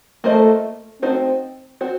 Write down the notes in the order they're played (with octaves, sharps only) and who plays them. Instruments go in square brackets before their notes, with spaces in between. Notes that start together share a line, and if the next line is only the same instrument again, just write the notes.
[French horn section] A3 [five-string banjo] A#3 F4 C5 D#5
[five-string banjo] A3 D#4 F#4 C5 [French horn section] C4
[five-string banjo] C4 F#4 C5